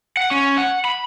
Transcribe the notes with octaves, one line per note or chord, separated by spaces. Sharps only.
F#5
C#4
F#5
B5